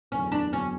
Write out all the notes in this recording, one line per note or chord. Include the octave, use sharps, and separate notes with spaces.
F#1 E2 D3 F#3 B3 C#4
D4
D3 F#3 B3 C#4